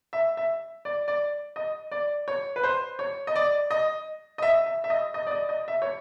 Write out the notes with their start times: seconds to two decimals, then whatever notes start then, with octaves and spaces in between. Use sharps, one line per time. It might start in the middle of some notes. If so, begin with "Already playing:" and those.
0.13 E5
0.37 E5
0.85 D5
1.08 D5
1.56 D#5
1.91 D5
2.28 C#5
2.56 B4
2.64 C5
2.99 C#5
3.27 D#5
3.36 D5
3.71 D#5
4.38 D#5
4.42 E5
4.66 E5
4.84 E5
4.90 D#5
5.14 D#5
5.27 D5
5.31 D#5
5.49 D#5
5.68 E5
5.82 C#5